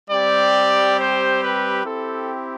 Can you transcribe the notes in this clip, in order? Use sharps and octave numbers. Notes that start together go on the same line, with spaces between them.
G3 C4 G4 D5
C5
B4
C4 E4 G4 A4